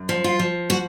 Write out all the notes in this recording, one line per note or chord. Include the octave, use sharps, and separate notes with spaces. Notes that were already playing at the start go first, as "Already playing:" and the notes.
Already playing: F#2
F3
F4
F3
F#4